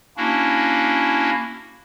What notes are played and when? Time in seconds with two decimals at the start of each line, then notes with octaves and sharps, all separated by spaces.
0.17 A#3 C#4 D4 E4 F#4